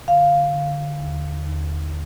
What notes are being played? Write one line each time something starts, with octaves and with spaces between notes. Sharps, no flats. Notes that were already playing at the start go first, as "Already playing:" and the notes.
D3 F5
D3
D#2
D#2